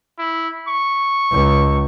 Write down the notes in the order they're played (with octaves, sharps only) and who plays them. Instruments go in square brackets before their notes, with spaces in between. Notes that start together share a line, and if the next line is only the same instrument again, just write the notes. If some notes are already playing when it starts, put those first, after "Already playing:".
[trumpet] E4
C#6
[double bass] C#2